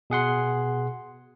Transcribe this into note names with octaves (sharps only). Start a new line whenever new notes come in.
B2 G#4 F#5 C6